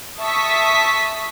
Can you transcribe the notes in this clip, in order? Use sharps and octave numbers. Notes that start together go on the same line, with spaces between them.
E5 A5 C#6 D#6 B6